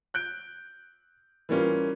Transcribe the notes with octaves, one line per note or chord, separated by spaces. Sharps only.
F#6 G6 D7
E3 G3 A#3 C#4 F4